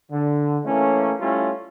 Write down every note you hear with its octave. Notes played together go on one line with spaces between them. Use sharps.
D3
E3 A3 A#3 C#4
G3 A3 C#4 E4 F4